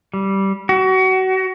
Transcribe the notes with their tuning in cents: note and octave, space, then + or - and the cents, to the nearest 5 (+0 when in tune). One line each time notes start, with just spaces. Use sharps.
G3 -10
F#4 +30